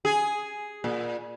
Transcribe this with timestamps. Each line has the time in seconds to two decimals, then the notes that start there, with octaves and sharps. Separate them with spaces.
0.05 G#4
0.84 A#2